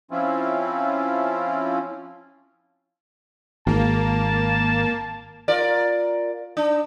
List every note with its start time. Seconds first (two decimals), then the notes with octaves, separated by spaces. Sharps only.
0.11 F3 C4 C#4 E4 F4
3.67 G#1 A#3 A5
5.48 F4 A#4 D5
6.57 D4